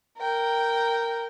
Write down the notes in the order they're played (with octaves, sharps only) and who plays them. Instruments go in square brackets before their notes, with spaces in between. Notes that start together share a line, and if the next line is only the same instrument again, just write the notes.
[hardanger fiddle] A#4 G5